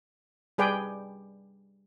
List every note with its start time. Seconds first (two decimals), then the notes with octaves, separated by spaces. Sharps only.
0.58 G3 G#4 B4 D5 G5